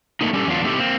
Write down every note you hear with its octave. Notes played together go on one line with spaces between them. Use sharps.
A3 A#3 D4 D#4
G3 C#4 G4 A4
E2 F#3 D4 F4
A3 C4 D#4 E4 G4 A4
A#3 C4